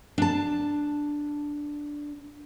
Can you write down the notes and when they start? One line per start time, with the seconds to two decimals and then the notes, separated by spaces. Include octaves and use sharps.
0.18 D4 A5